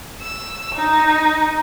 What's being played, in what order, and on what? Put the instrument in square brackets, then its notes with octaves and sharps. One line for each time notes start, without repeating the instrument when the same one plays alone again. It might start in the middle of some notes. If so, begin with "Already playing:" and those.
[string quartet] E6
D#4